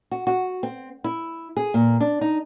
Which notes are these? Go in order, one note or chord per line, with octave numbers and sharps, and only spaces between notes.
F#4
F#4
C4
E4
G#4
A#2
D4
D#4